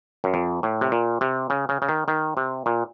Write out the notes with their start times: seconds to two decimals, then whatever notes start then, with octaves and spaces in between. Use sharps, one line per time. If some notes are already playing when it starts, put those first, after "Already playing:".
0.24 F#2
0.34 F2
0.63 A2
0.81 C3
0.92 A#2
1.21 C3
1.50 C#3
1.69 C#3
1.82 C#3
1.89 D#3
2.08 D#3
2.37 C3
2.66 A#2